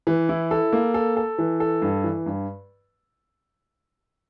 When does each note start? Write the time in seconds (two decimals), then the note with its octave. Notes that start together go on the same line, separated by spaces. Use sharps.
0.07 E3
0.29 E4
0.51 A4
0.73 A#3
0.94 A4
1.17 A4
1.38 E3
1.60 A4
1.82 G2
2.04 E3
2.26 G2